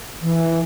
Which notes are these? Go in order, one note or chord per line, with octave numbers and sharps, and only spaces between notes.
E3